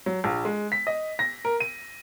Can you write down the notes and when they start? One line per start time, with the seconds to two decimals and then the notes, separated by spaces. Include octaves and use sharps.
0.06 F#3
0.24 A#1
0.45 G#3
0.72 B6
0.87 D#5
1.19 A#6
1.45 A#4
1.60 D#7